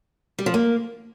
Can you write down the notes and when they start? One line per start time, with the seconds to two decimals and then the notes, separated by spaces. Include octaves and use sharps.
0.39 G3
0.46 F3
0.54 A#3